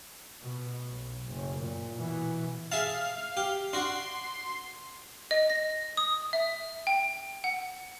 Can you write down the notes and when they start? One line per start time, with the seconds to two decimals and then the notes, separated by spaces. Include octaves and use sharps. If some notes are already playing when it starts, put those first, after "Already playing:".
0.42 B2
0.91 B1
1.27 F#1
1.60 A#2
1.94 B2 E3
2.72 G#4 E5 F5 A5
3.37 G4
3.73 D4 F#4 C6
5.31 D#5
5.50 A#6
5.97 D#6
6.33 E5
6.87 G5
7.44 F#5